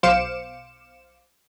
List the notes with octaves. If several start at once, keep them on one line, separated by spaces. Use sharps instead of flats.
B1 C5 F5 D6 C#7 E7